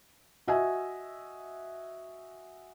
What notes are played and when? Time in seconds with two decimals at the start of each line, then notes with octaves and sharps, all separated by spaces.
0.48 F#4 D#5 E5 G#5